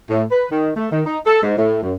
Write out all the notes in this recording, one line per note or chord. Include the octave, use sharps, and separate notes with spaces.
A2
B4
D#3
A3
D#3
D#4
A4
G#2
A2
F#2